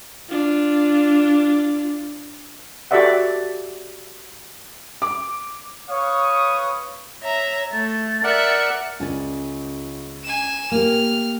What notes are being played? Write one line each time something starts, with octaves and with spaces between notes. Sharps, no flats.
D4 F4
F#4 G4 A4 D5 E5 F#5
D6
B4 C#5 F5 C#6 D#6
C#5 E5 A#5
A3 A6
A#4 D5 E5 F#5 C#7
C#2 D5 G#5
G#5 E7
A#3 G4 F6